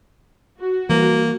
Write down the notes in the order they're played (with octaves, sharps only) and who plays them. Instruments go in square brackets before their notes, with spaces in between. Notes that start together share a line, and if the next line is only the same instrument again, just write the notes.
[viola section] F#4
[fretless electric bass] E3 G3 [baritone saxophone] A#3